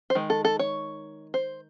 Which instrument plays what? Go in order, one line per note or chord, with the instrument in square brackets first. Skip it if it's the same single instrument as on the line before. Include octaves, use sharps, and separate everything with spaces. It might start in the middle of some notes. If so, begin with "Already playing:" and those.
[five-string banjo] C5
D#3 G#3
A4
A4
C#5
C5